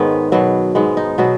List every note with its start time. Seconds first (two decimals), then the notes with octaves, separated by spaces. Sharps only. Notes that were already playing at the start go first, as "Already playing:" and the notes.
Already playing: G#2 D#3 G#3 B3 B4 C#5
0.32 B2 F#3 B3
0.75 G#2 G#3 B3
0.97 D#4
1.18 B2 F#3 B3 F#4